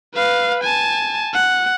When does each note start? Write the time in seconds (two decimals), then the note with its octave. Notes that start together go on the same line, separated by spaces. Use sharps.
0.15 B4 F5
0.64 G#5 A5
1.34 F#5